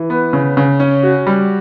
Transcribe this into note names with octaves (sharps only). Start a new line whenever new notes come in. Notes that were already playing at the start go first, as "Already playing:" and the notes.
Already playing: E3
B3
C#3
C#3
C#4
F#4
G3